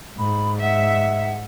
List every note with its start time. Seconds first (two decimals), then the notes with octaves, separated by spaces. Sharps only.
0.18 G#2 B5
0.62 E5 F#5